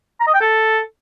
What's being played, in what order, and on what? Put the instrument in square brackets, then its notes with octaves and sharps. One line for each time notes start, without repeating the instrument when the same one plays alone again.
[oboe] A#5
D#5
G5
A4